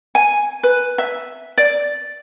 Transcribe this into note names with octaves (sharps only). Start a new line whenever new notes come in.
G#5
B4
E5
D5